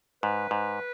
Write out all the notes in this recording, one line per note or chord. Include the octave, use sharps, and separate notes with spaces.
G#2 B4
G#2